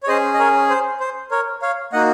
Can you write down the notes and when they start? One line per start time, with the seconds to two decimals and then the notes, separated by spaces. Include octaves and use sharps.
0.03 C#5
0.08 C#4 G#4 C5 D#5
0.34 D#5
0.39 A#4 C#5
0.70 C5
1.00 C5
1.31 A#4 C#5
1.62 C#5 F5
1.93 A#3 D#4 F#4 D#5 F#5